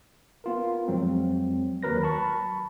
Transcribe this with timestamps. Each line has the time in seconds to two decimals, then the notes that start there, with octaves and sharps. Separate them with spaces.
0.44 B3 F4 A#4
0.88 F2 F#3 G#3 C4
1.83 D#2 F#3 A#4 B4 A#6
2.03 A5 B5 C#6